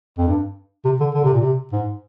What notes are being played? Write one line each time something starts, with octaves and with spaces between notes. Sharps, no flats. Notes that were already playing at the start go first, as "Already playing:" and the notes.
F2
G2
C3
D3
D3
C3
A#2
C3
G#2